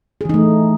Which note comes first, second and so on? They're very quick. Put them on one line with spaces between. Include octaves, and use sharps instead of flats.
G#4 E3 D#4 A3